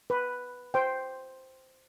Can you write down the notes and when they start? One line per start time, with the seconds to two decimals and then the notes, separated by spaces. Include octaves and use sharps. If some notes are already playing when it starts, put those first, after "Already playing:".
0.10 B4
0.74 C5 G5